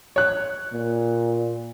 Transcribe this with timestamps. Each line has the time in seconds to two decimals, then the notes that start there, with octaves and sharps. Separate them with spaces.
0.16 C#5 F#6
0.72 A#2